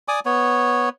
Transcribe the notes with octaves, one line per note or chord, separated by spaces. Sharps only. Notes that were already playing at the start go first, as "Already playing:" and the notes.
D5 G#5 D6 D#6
B3 C#5